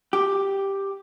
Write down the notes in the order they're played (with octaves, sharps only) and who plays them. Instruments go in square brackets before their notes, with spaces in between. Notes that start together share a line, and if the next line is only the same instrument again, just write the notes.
[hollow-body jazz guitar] G4